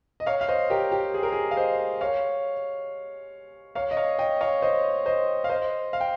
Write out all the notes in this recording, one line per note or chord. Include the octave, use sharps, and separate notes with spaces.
D#5
C#5 F5
F5
C5 D#5
G4 A#4
G4
G#4
A#4
G#4
F5
C5 D#5
C#5 F5
C#5 F5
D#5
C#5 F5
D#5 G5
C#5 F5
C5 D#5
C5 D#5
F5
C5 D#5
F5
G5